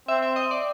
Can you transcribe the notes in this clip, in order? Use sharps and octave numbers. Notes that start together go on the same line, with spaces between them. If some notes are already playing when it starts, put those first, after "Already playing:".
C4 E5
E5
D#5
D5